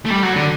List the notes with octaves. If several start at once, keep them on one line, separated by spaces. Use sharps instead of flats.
A3
G3
F#3
D3